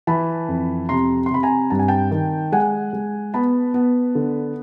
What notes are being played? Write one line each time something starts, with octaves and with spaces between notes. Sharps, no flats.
E3 A5 B5
F2
C3 A#5 C6
C6
C3 B5
G#5 A#5
G2 A5
G#5
G5 A5
D#3
G#3 F#5 G#5
G#3
B3 A5 B5
B3
D3